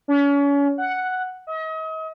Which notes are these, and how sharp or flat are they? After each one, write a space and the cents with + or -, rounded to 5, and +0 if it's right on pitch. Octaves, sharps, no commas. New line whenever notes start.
C#4 +35
F#5 +0
D#5 +40